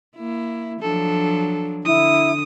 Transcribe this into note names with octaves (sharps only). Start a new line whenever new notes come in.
A#3 E4
F3 F#3 D4 A4
D3 E4 D#6